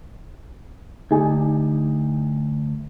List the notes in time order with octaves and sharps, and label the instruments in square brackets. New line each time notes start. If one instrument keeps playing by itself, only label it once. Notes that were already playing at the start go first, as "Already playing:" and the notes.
[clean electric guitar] D2 [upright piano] D#4 G4 G#5